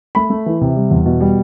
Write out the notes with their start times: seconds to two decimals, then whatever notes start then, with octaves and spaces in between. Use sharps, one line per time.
0.15 A3 B5
0.30 A3
0.46 E3
0.61 C3
0.76 G3
0.91 E2
1.06 B2
1.20 G3